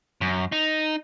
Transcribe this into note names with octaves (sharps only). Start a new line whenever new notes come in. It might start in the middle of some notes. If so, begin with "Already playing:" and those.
F#2
D#4